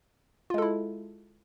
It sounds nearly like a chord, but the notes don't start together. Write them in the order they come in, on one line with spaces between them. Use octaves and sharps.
F4 G#3 A4 E4